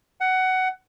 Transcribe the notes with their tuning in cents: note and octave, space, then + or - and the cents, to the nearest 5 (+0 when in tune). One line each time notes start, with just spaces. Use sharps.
F#5 +15